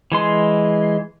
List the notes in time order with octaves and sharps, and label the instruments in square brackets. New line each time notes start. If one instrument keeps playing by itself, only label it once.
[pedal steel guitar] E3 G#3 C6